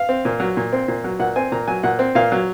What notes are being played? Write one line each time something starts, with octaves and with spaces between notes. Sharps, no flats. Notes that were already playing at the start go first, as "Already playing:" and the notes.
Already playing: F5
C4
A#2
F#3
A#2
C4
A#2
F#3
A#2 F#5
C4 G#5
A#2 A#5
F#3 G#5
A#2 F#5
C4
A#2 F5
F#3